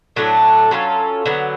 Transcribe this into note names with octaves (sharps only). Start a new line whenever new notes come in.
A2 F#3 A3 D4
F#3 C#4 F4 A4
D3 F#3 B3